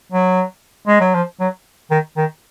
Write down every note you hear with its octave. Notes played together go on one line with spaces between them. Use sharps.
F#3
G#3
F#3
F3
F#3
D#3
D#3